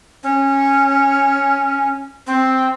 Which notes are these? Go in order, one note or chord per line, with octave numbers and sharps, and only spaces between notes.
C#4
C4